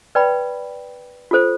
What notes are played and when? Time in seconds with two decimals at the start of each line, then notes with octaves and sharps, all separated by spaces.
0.15 B4 D5 G5 B5
1.31 F4 A4 C5